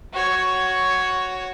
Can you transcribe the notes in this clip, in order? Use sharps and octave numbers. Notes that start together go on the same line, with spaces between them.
F#4 C#5